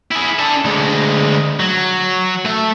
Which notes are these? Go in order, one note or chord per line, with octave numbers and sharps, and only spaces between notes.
E4 G#4
D4 A4
D2 G#3
F#3
A3 E5